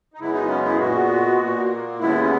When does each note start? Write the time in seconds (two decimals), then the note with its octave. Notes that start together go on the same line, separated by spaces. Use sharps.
0.14 D#4
0.19 F#2 C#3 G#3 B3 E4
0.34 D#4
0.49 C#4
0.65 E4
0.73 G#4
0.79 A#2 G#3 B3 F#4
1.39 A#2 A#3
1.99 D#2 C#3 G#3 B3 E4
2.24 C#4